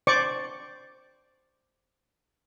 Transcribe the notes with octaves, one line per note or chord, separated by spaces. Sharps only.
C5 D5 C#6 D6